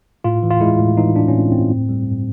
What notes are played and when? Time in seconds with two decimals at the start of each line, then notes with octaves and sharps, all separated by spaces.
0.24 A2 F4
0.43 E3
0.51 F4
0.61 G#3 E4
0.79 A2
0.97 E3 D#4
1.16 A2 D4
1.28 C#4
1.34 A2 C4
1.52 A2 C4
1.70 G2
1.89 G3
2.06 G2